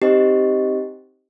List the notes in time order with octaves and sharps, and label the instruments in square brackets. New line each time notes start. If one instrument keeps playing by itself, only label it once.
[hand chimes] C4 D#4 G4 C5 D#5